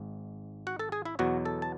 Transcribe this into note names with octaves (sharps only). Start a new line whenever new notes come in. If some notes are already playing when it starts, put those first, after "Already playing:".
Already playing: G#1 G#2
F#4 F#5
A4 A5
G#4 G#5
E4 E5
E2 B2 F#3 F#4 F#5
A4 A5
A5